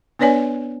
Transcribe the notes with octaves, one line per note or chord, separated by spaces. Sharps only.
B3 D4 B4 C#5 D5 G#5